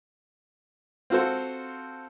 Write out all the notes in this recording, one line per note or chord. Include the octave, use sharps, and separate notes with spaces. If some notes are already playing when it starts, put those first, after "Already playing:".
C4 F4 F#4 A4 C5